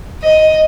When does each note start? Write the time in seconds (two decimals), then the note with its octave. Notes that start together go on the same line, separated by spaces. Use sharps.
0.23 D#5